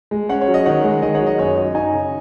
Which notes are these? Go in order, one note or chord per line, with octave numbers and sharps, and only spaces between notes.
G#3
C#4 C#5 F#5
C#5
F#3
D#5
D#3 C#5 F#5
G#3
D#3 D#5
C#5 F#5
F#3
D#5
F#2 C#5
F#3 D#5
D#4 D#5 G#5
C#3